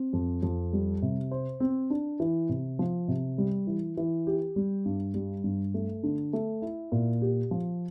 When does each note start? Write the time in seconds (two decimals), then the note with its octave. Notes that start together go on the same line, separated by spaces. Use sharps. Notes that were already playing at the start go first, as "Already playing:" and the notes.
Already playing: C4
0.13 F2
0.43 F2
0.73 G3
1.02 C3
1.31 C5
1.60 C4
1.90 D4
2.20 E3
2.49 C3
2.79 F3
3.08 C3
3.38 G3
3.67 E3
3.97 E3
4.27 G4
4.56 G3
4.86 G2
5.14 G3
5.44 G2
5.74 A3
6.03 D3
6.33 A3
6.62 E4
6.92 A#2
7.22 G4
7.51 F3